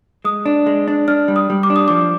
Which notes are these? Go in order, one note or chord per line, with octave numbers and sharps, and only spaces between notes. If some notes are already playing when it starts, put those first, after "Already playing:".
G#3 D#6
D4
G#3
D4
D4 F6
G3
D#6
G3
D6
D4
D#6
F3 D6